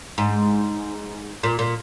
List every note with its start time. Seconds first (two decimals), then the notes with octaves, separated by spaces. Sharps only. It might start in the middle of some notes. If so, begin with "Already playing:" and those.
0.18 G#2
1.43 A#2
1.59 A#2